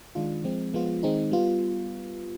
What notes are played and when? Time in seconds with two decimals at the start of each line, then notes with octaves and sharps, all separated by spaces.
0.15 D#3 G#3 D4 F4
0.44 F3 G#3 C4
0.74 F3 G#3 B3 F4
1.03 D#3 G#3 C4 D#4
1.31 G3 B3 F4